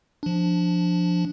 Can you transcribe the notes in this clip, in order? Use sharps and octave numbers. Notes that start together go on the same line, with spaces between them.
F3 D4